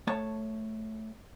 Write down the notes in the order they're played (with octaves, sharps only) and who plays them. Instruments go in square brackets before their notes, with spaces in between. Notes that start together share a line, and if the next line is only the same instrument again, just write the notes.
[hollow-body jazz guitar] A3 C#5 A5